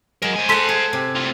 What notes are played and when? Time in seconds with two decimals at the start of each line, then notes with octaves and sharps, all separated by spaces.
0.22 F#3 G#3 A#4
0.36 C5 G#5
0.49 A4 E5 F#5 C6 B6
0.69 G#4
0.93 C3
1.16 A2 F4